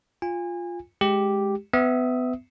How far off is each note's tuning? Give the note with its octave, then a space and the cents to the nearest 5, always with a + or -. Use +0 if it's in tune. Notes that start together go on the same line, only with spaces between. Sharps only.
F4 +0 G#5 -30
G#3 +5 G4 +0
B3 +30 E5 +0 D#6 +20